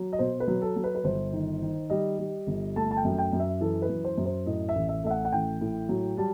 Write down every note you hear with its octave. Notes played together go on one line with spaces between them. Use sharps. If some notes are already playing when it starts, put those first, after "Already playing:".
Already playing: F#3
D#5
B2 C5
B4
F#3
A4
F#3
B4
B4
G1 C5
D#3
D#3
G3 D#5
G3
G1
A3 A5
A5
G5
F#2
G5
F#2
E5
E3 A4
B4
F#2
C5
F#2
C5
A2 D#5
E5
A1
E5
A3 E5
F#5
F#5
A1 G5
A2
F#3
G3 A5